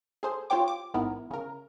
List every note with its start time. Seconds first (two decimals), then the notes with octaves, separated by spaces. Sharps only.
0.23 G#4 A4 C5
0.50 F4 G4 C5 C#5 G5 D6
0.68 D6
0.94 A1 G#2 B3 E4 A#4
1.31 C#3 A#4